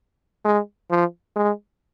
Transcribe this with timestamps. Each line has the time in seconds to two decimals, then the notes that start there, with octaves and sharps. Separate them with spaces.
0.45 G#3
0.90 F3
1.36 G#3